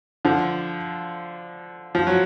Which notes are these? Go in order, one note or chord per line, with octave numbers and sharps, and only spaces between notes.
D3 F3
F3
F#3